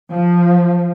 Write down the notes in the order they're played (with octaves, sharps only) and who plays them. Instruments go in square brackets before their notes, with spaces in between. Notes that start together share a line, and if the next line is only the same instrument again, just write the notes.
[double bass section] F3